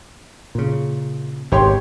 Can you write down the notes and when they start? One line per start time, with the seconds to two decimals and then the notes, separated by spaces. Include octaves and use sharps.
0.55 A#2 C#3
1.52 G#1 B2 G4 C#5 C6